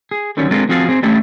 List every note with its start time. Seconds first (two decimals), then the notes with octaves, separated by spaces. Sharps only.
0.11 G#4
0.37 D3 D#3 F#3 G3 C#4
0.51 G#3 C4 D4 F4 A4 A#4
0.69 F3 C4 F#4 G#4 A4 F5
0.89 C4 G#4
1.03 G3 A3 C#4 D4 E4 G4